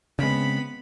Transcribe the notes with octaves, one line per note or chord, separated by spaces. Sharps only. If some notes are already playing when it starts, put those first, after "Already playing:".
C#3 G#3 B3 C4 B5